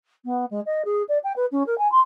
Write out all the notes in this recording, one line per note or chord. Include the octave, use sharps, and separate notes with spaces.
B3
G#3
D#5
G#4
D5
G5
B4
C#4
A#4
G#5
C6